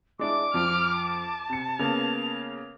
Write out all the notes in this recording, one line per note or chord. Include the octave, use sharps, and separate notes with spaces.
G#3 D4 E4 D6
F2 F3 F6
A5
C3 C#7
C#3 A#3 B3 F7